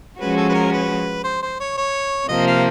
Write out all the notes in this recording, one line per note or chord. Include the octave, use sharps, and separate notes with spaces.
F3 G#3 C#4 F#4 B4
A4
B4
A#4
B4
C5
C5
C#5
C#5
C3 F3 A#3 D#5
F5